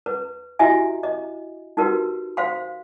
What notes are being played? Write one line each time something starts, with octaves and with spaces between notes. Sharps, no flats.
B4
E4 F#4 G4 D#5 E5 G#5
D#5
D#4 F#4 G4 A#4 B4
C5 F5 C6